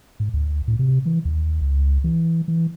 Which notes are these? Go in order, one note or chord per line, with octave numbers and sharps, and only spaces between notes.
G#2
D2
A2
C3
E3
D#2
C#2
E3
E3